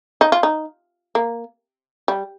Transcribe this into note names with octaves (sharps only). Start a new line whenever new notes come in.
D#4
F4
D#4
A#3
G3